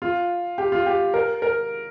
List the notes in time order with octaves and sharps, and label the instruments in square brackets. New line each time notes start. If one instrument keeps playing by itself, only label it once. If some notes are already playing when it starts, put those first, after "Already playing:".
[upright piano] F4
G4
F4
G4
A#4
A#4